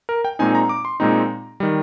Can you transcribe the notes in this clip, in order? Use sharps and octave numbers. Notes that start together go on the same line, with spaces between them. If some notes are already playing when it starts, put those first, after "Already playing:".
A#4
G5
A#2 G#3 C4 D#4 G#5
A#5
D6
C6
A#2 G#3 C4 D#4 A#5
D#3 G3